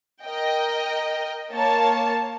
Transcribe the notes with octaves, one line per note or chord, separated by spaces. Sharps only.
A#4 D#5 G5
A#3 C#5 A5